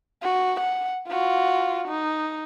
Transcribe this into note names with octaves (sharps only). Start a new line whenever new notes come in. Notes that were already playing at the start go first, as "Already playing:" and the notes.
F#4
F#5
F4 F#4
D#4